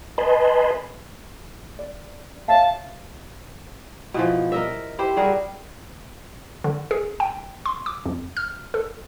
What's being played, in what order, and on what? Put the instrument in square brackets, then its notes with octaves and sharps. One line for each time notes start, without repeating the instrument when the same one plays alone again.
[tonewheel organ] B4 D#5 G#5 A5 B5 C6
[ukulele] D5
[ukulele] C#5 E5 F5 [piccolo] A5
[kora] B2 E3 F3
A#4 D#5 E5
E4 G4 C5
G3 F#4 G#4 A#4
[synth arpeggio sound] D3
G#4
G5
C6
D6
F2
F6
A4